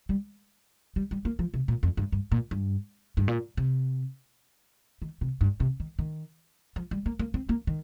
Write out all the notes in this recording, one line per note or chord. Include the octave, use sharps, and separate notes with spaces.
G3
G3
G3
A#3
F3
C3
A#2
F2
G2
G2
A#2
G2
G2
A#2
C3
D#3
C3
G2
C3
D#3
D#3
F3
G3
A#3
A#3
C4
A#3
D#3